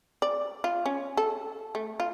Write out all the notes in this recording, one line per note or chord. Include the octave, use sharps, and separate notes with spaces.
D5
F4
C#4
A4
A3
F4